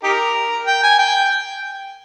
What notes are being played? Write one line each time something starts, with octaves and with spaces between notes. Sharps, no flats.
D#4 G4 A#4
G5
G#5
G5